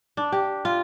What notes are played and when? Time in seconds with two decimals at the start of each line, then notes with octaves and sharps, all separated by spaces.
0.17 D4
0.32 G4
0.65 F4